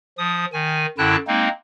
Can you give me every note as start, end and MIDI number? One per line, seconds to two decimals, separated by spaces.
0.18 0.45 53
0.18 0.45 87
0.53 0.86 51
0.53 0.86 80
0.98 1.16 42
0.98 1.16 50
0.98 1.16 64
0.98 1.16 79
0.98 1.16 81
0.98 1.16 90
1.27 1.49 56
1.27 1.49 58
1.27 1.49 60
1.27 1.49 63